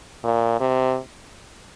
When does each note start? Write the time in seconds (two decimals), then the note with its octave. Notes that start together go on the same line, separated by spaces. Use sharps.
0.24 A#2
0.60 C3